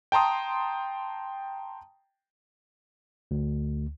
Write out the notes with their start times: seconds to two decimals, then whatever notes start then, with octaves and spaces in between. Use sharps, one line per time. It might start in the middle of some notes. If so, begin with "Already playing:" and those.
0.12 G5 A5 A#5 C6 D#6
3.31 D2